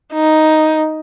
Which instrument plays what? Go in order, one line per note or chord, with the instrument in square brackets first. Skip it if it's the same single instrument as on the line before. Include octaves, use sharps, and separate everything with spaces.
[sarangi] D#4